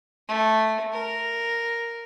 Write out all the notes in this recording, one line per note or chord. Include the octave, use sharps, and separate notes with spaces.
A3
A#4